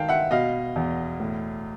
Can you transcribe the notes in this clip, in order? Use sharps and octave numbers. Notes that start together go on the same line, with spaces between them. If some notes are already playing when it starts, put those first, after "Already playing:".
Already playing: D#3 F5 G5 A5
E5 F#5
B2 D#5 F5
E2
A2